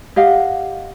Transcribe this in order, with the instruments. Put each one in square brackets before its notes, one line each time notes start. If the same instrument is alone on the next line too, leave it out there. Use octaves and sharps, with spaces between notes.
[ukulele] G4 D#5 F5 F#5